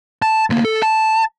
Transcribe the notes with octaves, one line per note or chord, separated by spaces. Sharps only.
A5
D2 A#3
A4
A5